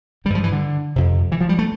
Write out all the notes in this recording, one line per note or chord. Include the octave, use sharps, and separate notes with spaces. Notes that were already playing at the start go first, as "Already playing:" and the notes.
D3 G3
G2 F3
E3
D3
F2 C3
E3
F3
G3
A3